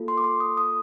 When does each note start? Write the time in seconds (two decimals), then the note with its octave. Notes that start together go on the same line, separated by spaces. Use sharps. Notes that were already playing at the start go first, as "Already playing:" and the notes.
Already playing: A#3 F4 A4
0.08 C6
0.18 D6
0.24 C6
0.40 D#6
0.57 D#6